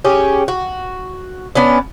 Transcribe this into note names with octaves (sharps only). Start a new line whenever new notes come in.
C#4 G4 G#4
F#4
B3 C#4 D4